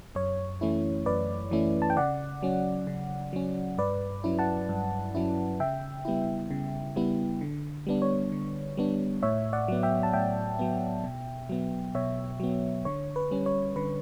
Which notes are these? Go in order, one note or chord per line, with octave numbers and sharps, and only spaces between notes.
F#2 C#5
E3 A3 C#4 E4
F#2 B4 D5
E3 A3 C#4 E4
A5
G5
C#3 D5 F#5
F#3 C#4
C#3
F#3 C#4
G2 B4 D5
F#3 C#4 E4
F#5 A5
G2
F#3 C#4 E4
C#3 E5 G5
G3 B3 E4
C#3
G3 B3 E4
D3
G3 B3 D4
C#5
D3
G3 B3 D4
A2 C#5 E5
D5 F#5
F#3 B3
E5 G5
A5
A2 E5 G5
F#3 B3
B2
F#3 B3
B2 C#5 E5
F#3 B3
D3 C#5
B4
G3 C#4
C#5
D3 B4